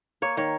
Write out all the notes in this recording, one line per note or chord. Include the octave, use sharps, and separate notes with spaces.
A#3 C#5
D#3 C#5